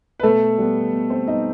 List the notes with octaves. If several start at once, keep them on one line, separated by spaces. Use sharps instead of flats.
B4
B2 A3 A4
G3 B3
B2
C4 C5
G3 B3 D#4 D#5